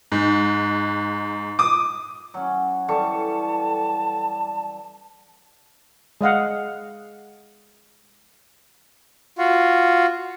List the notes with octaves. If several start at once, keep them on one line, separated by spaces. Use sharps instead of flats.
G#2
D6 D#6
F#3 C#4
E3 G3 A4 A5 C#6
G#3 D#5 F5 F#5
F4 F#4